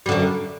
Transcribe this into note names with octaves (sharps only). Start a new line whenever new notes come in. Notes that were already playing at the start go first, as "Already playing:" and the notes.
F#2 D3 G3